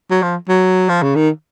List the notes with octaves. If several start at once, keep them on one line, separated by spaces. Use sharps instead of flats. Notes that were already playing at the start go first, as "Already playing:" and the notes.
F#3
F3
F#3
F3
C#3
D#3